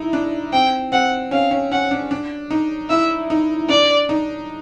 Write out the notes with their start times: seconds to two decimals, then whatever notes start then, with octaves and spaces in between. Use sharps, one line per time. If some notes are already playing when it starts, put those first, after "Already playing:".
Already playing: D#4 E4
0.13 D4
0.53 C4 G5
0.92 C4 F#5
1.31 C#4 F5
1.51 C#4
1.72 C#4 F#5
1.91 D4
2.11 D4
2.51 D#4
2.90 E4 E5
3.30 D#4
3.69 D4 D5
4.09 D#4